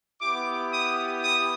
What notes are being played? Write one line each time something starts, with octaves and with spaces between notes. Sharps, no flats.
B3 E4 G4 D6
D#6
D#6